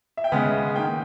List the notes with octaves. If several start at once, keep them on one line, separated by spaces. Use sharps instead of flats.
E5
G5
C#3 G#3 B3 G#5
D#3 A#3 G5